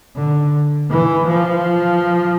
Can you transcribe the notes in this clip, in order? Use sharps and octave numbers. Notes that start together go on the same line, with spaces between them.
D3
E3
F3